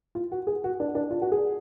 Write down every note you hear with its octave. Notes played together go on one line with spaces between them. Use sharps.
F4
F#4
G#4
F#4
D4
D4
F4
F#4
G#4